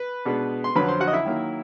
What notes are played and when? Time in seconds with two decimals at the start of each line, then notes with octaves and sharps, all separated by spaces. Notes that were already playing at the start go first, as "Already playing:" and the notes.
Already playing: B4
0.25 B2 G#3 B3 D4
0.64 C6
0.75 F2 D3 F#3 B4 B5
0.88 C5 C6
1.00 F#4 F#5
1.07 D#5
1.13 E4 E5
1.25 D#3 F#3 A#3